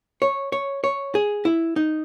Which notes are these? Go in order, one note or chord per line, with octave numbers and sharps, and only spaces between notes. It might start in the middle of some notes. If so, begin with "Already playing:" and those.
C#5
C#5
C#5
G#4
E4
D#4